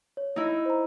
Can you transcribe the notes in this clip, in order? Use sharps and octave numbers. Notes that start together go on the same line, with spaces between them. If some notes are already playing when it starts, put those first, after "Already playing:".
C#5
D#4 E4
C5 A#5